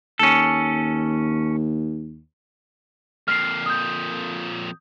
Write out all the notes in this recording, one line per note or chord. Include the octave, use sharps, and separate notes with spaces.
D#2 C#4 A4
F2 A#2 F6 C7
D#6 G6